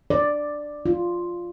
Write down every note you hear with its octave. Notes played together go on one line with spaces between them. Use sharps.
D5
F4